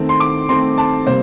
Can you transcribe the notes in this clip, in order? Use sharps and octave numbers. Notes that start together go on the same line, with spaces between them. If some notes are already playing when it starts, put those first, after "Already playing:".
Already playing: D#3 A3 C4
C6
D6
D#3 A3 C4 C6
A5
C3 G3 A#3 C5